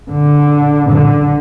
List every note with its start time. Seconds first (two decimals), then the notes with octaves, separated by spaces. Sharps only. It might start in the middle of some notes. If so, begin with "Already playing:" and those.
0.11 D3
0.90 D3